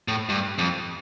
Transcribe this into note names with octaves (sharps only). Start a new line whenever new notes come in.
A2
G2
F2